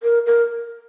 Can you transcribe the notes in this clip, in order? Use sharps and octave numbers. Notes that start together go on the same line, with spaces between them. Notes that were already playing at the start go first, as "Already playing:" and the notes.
A#4
A#4